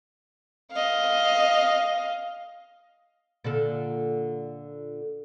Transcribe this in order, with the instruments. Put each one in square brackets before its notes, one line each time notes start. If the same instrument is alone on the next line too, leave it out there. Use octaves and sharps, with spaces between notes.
[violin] D#5 F5
[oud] A#2 D3 A4